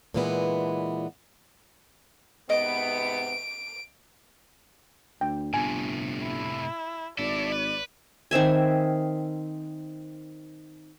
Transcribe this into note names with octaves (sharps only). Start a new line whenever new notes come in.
A#2 D3 E3 G#3 B3
G#2 C3 B3 D#5 D7
D2 G5
G1 A2 C3 G#5
E4
G#1 E4 A4 D5
B4
D#3 C4 E5 G#5